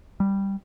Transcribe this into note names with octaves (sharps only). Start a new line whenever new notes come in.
G3